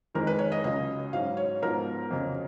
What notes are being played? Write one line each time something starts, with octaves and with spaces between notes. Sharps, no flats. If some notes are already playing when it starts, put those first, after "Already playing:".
F2 D#3 G#3 A#4
B4
C#5
D#5
C#2 C#3 F#3 D#5
G#2 F#3 C#4 F5
C#5
G#2 F3 B3 A#4
F2 C#3 F#3 C#4